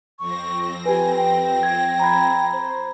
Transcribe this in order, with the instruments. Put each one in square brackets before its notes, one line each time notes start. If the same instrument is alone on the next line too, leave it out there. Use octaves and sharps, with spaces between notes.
[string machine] F2 C4 A#6 [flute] C#6
[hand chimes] G4 B4 [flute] G#5
[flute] G5
[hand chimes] G#6
A#5 B5 G#6
[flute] C5